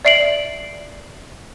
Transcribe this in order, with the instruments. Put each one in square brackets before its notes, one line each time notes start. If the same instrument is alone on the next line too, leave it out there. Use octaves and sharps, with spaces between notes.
[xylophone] D5 E5 C7 D7 F#7